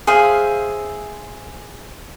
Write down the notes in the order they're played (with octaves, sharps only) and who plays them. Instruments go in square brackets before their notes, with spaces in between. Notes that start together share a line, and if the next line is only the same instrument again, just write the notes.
[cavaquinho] G#4 C5 E5 F5